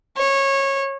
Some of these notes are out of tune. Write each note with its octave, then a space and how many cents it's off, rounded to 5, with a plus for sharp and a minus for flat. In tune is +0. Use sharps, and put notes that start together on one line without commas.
C#5 -20